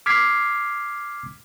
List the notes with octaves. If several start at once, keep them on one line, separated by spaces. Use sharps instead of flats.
D6 F6 G#6 B6 C7